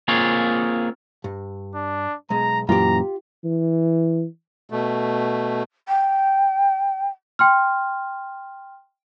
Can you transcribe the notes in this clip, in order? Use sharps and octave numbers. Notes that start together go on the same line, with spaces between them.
A#3 C4 F4 G#4 C#5
G2
D4
B1 G#3 A#5
F#2 A#2 E3 F4 G4 A#5
E3
B2 A3
G5
G5 C6 F6